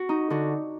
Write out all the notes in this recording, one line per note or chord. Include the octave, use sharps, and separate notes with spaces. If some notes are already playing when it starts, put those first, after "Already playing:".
Already playing: F#4
D#4
D3 F#4